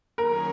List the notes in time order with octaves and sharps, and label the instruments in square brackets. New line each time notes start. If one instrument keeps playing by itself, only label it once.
[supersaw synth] D#3 F#3 C#4 G#4 C#5 [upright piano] A#4